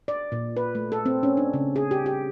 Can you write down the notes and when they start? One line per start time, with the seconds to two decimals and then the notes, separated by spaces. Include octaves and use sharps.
0.08 D5
0.32 A#2
0.57 B4
0.75 A3
0.92 A4
1.06 C4
1.23 C#4
1.37 D4
1.54 C#3
1.76 G#4
1.91 G4
2.06 G4